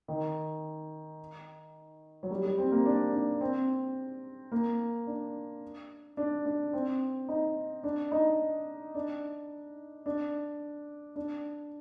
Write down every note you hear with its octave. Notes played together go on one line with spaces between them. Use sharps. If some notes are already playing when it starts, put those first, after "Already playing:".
D#3
F#3
G3
G3
C4
A#3
D4
D4
C4
A#3
D4
D4
D4
C4
D#4
D4
D#4
D4
D4
D4